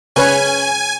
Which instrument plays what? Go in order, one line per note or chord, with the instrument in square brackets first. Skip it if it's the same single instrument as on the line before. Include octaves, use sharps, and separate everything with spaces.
[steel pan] C#3 B4 C#5 [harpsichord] C#4 [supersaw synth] G#5